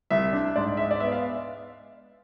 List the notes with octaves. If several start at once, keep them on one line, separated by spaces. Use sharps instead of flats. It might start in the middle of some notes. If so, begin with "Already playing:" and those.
C2 E5
D4
G#2 D5
G#3 E5
D5
B3 E5
F5